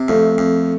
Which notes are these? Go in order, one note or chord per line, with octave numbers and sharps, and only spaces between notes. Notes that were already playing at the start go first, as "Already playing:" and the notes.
Already playing: C3
F2 A3
F2